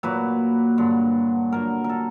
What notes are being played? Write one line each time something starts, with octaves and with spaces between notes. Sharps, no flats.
A#2 F#3 A#3 B4
G2 D3 F#3
A#2 F#3 A#3 A#4
A#4
A4